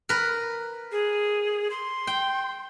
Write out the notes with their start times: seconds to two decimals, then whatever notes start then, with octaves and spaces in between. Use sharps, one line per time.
0.09 A#4 B4
0.92 G#4
1.70 C6
2.07 G5